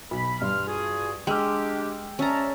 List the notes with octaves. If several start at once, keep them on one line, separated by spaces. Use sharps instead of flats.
B1 B5
G2 E3 C6 F6
F4 F#4 G#4
G#3 D4 G4 G5 E6 F6
C#4 D5 E5 A5 A#5